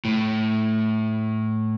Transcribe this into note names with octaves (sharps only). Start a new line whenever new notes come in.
A2